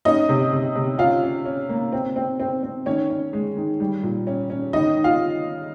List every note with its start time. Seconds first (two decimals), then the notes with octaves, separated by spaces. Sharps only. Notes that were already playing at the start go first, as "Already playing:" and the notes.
0.05 C#4 D#4 D#5
0.29 C3
0.52 C3
0.76 C3
0.99 C#4 F4 F5
1.23 C#4
1.45 C#4
1.69 A#3
1.92 C4
2.16 C4
2.40 C4
2.63 C4
2.86 D#3 C#4 C#5
3.10 C#4
3.33 G#3
3.56 D#3
3.80 G3
4.03 A#2
4.27 C#4
4.50 C#4
4.73 D#3 D#4 D#5
4.96 D#3
5.04 F4 F5